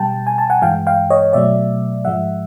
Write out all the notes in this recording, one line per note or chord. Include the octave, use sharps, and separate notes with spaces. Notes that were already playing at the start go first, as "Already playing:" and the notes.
Already playing: B2 G3 G5 A5
G#5
A5
F#5 G#5
G2 E3 G#3 F5 G5
F5 G5
C#5 D#5
B2 F#3 A3 D5 E5
G#2 F3 G#3 E5 F#5